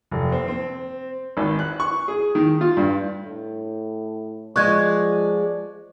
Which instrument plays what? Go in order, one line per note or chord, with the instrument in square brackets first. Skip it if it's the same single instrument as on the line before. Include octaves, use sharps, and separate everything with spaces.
[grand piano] F1
C4
C4
[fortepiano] G#1
F#6
C#6
G#4
D#3
F4
G2
[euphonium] A2
[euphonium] F3 [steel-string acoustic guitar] G#3 D5 [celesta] C#6 F#6 G#6